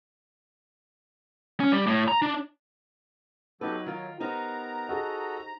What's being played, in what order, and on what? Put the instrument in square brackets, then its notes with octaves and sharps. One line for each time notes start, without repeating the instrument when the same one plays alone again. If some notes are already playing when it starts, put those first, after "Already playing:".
[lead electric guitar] C#4
G3
A2
A#5
D4
[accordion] F#3 [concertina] B3 G4 A4 [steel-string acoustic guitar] D#4 B4
[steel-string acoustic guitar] D#3 F4 [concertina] A#4
[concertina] B3 A#4 [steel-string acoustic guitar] D#4 G4 C5 [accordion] A#5
[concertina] F#4 A4 D#5 [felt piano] G#4 F#5